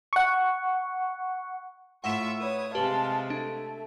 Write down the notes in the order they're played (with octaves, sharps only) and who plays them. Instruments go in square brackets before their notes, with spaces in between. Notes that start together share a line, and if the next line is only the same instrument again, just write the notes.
[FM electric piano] F#5 C#6
[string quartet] A2 E5 E6 [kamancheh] F4 C#6 [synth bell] F#5 E7
[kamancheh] B4 C#5 [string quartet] D#6
[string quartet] C3 G#3 [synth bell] G4 B4 [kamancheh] F5 A5
[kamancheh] A3 [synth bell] D4